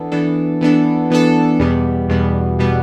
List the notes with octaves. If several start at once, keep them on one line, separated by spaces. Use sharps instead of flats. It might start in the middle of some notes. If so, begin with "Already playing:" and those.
Already playing: E3 B3 D4 A4
E3 B3 D4 A4
E3 B3 D4 A4
E3 B3 D4 A4
E2 B2 G3 B3
E2 B2 G3 B3
B2 G3 B3